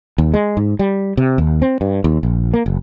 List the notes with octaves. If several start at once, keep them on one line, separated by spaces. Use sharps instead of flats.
D#2
G#3
G#2
G3
C3
D#2
C4
G2
D#2
A#1
A#3
F#1